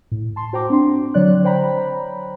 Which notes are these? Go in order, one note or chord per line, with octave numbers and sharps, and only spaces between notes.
A2
A5 C6
F#4 C5 G5 A#5 D6
C4 D4 C6
D3 F#3 C#5 D5 F#6
C5 C#5 G5 A#5 B5